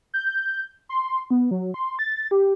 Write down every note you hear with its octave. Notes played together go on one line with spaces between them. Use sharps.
G6
C6
B3
F#3
C6
A6
G4